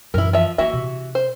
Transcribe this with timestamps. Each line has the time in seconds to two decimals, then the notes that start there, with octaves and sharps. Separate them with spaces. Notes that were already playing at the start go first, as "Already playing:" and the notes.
0.14 F#2 E3 E4 A#4
0.33 F3 E5
0.58 E3 A#3 F#4 E5
0.73 C3
1.15 C5